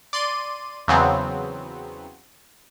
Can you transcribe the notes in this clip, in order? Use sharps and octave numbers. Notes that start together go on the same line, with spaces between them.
D5 C6 D#7
E2 C#3 F#3 B3 C4